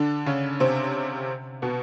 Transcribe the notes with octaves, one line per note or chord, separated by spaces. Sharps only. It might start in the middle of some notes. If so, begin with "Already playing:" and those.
Already playing: D3 D4
C#3 C#4
C3 C4
B2 B3